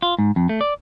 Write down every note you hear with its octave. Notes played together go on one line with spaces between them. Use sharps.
F4
G#2
F2
A3
D5